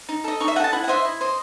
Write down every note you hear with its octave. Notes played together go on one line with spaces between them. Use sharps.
D#4
A4 D#5
D#4 C#6
E5
A4 D#5 F#5 A5
E4 F#5
F#5
C5 D#5 E5
E4
C5 D#5